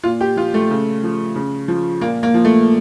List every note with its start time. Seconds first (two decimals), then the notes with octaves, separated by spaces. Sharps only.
0.04 A#2 F4
0.21 G4
0.36 F3 F4
0.54 A3
0.70 C#3
1.03 F3
1.35 C#3
1.68 F3
2.01 A#2 A#3
2.23 A#3
2.34 F3
2.45 A3